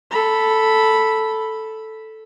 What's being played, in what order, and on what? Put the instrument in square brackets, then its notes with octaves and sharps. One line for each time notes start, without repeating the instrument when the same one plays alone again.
[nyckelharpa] A4 B5